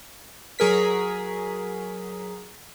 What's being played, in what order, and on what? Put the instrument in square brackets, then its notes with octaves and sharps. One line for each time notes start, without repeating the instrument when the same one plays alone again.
[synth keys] F#3 G#4 A#4 B6